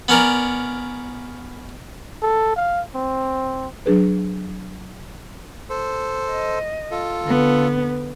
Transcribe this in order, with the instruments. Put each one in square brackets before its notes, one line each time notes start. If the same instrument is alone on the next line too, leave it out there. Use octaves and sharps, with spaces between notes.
[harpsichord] B3 C#4 A#4 D5
[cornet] A4
F5
C4
[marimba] F#3 D4 G#4 B4
[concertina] A4 C5
[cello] D#5
[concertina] F4 A4
[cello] D3 B3